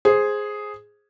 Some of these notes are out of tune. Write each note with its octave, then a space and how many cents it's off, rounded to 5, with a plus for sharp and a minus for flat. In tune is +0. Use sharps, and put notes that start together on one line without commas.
G#4 +0 C5 +5